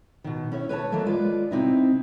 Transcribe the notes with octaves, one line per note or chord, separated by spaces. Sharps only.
B2 D#3
C#4 E4 C#5
B4 C#5 D#5 A5
D#3 E3 F#3 A3 A#3
G#3 F4 B4 D5
C3 C4 D#4 E4